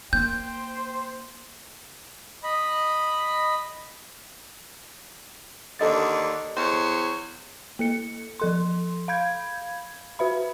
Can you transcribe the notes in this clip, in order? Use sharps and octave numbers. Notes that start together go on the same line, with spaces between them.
A#3 C5 G5 G6
D#5 B5
D#2 D3 A4 D#5 A6
E2 C5 C#5
A#3 A4 C#7
F3 A4 C6
F5 B5 G6 G#6
F#4 B4 E5 B5